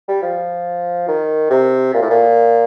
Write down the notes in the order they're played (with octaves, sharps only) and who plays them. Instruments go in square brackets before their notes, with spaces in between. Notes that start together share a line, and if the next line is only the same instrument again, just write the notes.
[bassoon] G3
F3
D#3
C3
A#2
A2
A#2